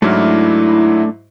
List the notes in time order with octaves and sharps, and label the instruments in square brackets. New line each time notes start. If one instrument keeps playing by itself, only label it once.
[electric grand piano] G#2 F#3 [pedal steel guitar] A3 D4 F6 [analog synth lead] E4